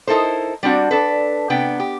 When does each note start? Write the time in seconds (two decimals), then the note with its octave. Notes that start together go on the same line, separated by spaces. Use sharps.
0.07 D#4 E4 A4 A#4 C5
0.63 G3 C4 D4 F#4
0.91 D4 A4 B4
1.50 C3 B3 D4 G5
1.80 G4